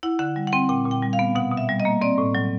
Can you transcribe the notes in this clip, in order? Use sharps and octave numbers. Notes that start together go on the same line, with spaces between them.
E4 F#5
D3 F#5
G3
F#5
C4 G5
A#2 G5
A#2
G5
G3
F5
B3
B2 F#5
B2
E5
G3
D#5
A#3
C4 D5
A2
F#3